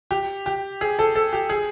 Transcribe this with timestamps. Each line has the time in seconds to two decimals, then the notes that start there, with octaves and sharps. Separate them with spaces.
0.11 G4
0.46 G4
0.81 G#4
0.99 A4
1.16 A4
1.33 G4
1.50 G#4